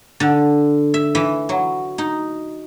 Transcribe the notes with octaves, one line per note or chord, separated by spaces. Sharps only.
D3
E5
E3
F#3
D#4